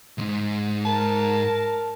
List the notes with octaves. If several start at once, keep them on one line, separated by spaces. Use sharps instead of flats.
C2 G#2
A#4 A5